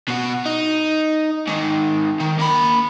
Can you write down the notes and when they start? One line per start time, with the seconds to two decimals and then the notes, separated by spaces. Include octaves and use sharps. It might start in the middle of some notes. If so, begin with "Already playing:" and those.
0.08 B2 F#4
0.46 D#4
1.47 G#2 D#3
2.20 D#3
2.39 A#3 B5